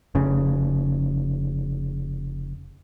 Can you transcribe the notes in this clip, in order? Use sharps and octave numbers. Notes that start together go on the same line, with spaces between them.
F1 C#3